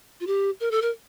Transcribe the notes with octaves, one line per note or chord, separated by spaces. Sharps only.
F4
G4
A#4
A4
A#4